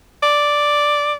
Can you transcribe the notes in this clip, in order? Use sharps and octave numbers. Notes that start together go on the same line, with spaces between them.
D5